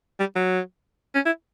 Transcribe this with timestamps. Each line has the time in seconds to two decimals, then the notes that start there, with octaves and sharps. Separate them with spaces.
0.20 G3
0.36 F#3
1.15 C#4
1.26 E4